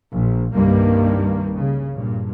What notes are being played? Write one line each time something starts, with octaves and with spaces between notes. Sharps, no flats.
A#1
C2 G2 D#3 G3 A#3
C#3
G2 A#2